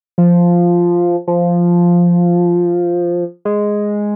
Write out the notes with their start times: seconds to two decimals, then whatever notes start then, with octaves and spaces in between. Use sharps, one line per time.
0.18 F3
1.28 F3
3.45 G#3